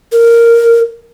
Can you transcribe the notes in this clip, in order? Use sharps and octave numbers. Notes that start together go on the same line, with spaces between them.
A#4